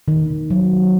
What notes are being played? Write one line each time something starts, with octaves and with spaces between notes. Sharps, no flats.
D#3
F#3